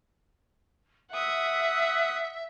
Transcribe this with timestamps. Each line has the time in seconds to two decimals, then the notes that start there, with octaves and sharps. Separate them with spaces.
1.11 E5 F#5 D#6